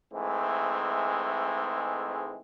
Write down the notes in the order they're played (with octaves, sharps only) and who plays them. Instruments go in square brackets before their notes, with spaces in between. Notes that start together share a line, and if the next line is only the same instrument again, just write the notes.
[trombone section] G#2 E3 G#3 A3 C4